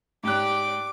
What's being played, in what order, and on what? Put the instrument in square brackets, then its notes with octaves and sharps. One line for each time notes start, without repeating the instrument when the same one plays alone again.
[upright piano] G#2 F#6 [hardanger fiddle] G4 D5 [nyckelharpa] D6